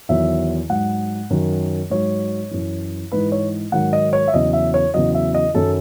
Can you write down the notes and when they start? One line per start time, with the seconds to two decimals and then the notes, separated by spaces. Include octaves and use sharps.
0.09 E2 D#3 F#3 E5
0.70 G#2 F#3 F#5
1.30 F#2 D#3 F#3
1.90 G#2 F#3 C#5
2.51 F#2 E3
3.12 G#2 E3 B4
3.32 C#5
3.72 G#2 D#3 F#3 F#5
3.93 D#5
4.13 C#5
4.28 E5
4.34 E2 C#3 F#3 D#5
4.53 E5
4.74 C#5
4.94 E2 C#3 F#3 D#5
5.14 E5
5.35 D#5
5.54 F#2 D#3 F#3 A4